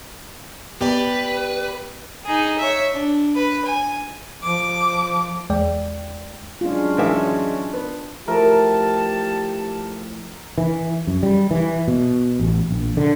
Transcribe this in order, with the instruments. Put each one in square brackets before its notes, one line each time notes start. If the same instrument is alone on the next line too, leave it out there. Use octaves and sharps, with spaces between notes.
[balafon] B3 [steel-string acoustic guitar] G4 D5 [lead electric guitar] B4
[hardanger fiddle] D#4 G#4
C#5 E5
D4
B4
G#5
[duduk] F3 [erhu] D6
[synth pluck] E2 G#3 D5 G5
[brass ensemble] F#3 G#3 C#4 [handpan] D4 F4
[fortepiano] A2 E3 E5
B3
[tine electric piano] F3 A3 E4 [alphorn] G4 [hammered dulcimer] A#4 [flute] A5
[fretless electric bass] E3
F#2
G3
E3
B2
A1
A#1
D3